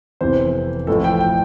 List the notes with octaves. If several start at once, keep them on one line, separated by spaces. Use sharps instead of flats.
F1 E2 C3 E3 C5
A1 A2 F3 A4
G5
G5